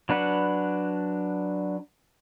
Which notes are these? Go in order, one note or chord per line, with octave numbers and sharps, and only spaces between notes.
F#3 D4 B4 F#5